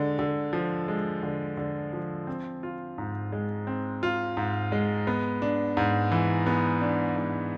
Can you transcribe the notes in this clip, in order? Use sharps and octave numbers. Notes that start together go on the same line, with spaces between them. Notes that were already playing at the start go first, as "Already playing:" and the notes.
Already playing: D3 G#3
D3
F3
G#3
D3
D3
F3
C4
F4
G#2
G#3
C4
F4
G#2
G#3
B3
D4
G#2
E3
B3
D4
G#2